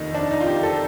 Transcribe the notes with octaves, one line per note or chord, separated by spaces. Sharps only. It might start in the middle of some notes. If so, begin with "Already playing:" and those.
Already playing: F1 D#2 D#3 D#4
D4
D#4
F4
G4
A4